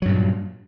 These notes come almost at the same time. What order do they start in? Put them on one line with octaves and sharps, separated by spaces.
F#3 G2 A#2